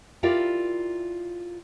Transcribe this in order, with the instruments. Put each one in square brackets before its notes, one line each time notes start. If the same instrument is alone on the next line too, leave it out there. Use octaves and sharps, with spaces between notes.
[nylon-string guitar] E4 F4 G4 A#4 D5